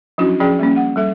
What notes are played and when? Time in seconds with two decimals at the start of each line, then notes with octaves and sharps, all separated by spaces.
0.18 F3 F#3 C#4 D4 E4 F#4
0.40 F3 C#4 G#4 D5 G5
0.59 G3 A#3 C#4
0.76 F#5
0.96 G3 A4 E5